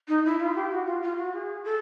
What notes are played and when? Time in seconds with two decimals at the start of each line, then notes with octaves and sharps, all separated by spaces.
0.08 D#4
0.25 E4
0.40 F4
0.55 G4
0.71 F#4
0.87 F4
1.02 F4
1.18 F#4
1.33 G#4
1.64 A4